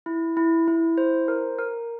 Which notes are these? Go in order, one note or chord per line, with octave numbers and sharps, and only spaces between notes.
E4
E4
E4
C5
A#4
A#4